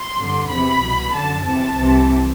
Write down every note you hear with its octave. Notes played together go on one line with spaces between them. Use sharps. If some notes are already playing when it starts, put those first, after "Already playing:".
Already playing: C6
G2 D3
E2 C3 E3 B5
C2 B2
F#2 D3 A5
E2 C3 E3 A5
C2 C3 E3